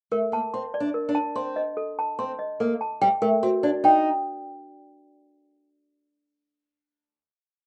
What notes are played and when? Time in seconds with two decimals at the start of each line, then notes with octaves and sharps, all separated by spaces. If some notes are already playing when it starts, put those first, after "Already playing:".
0.11 A3 A#4
0.32 A#3 A5
0.54 C4 C6
0.74 D5
0.80 D4
0.94 A#4
1.09 D4
1.15 A5
1.35 C4 C6
1.56 D#5
1.77 A4
1.99 A5
2.19 C4 C6
2.39 D#5
2.60 A#3 A4
2.81 A5
3.01 G3 G5
3.22 A3 A#4
3.43 C4 F#4
3.63 D4 D5
3.84 D#4 G5